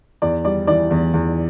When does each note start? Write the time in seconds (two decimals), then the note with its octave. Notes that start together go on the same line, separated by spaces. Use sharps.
0.22 E2 D5
0.45 G3 D5
0.67 E3 D5
0.91 E2
1.14 E2